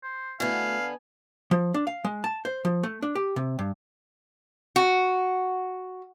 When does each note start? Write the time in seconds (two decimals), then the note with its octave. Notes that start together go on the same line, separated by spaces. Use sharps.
0.03 C5
0.40 D3 A3 B3 E4 F#4 F5 G#5
1.51 F3
1.74 D4
1.87 F5
2.05 G#3
2.24 A5
2.45 C5
2.65 F3
2.83 A3
3.02 D4
3.15 G4
3.36 C3
3.59 G2
4.76 F#4